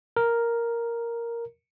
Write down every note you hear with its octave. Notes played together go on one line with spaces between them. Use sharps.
A#4